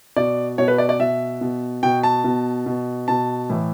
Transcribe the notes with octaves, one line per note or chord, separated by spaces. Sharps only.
B2 D5
B2 C#5
B4
D5
D5
B2 E5
B2
B2 G5
A5
B2
B2
B2 A5
A2 E3